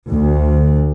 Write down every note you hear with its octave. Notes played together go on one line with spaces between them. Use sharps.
D2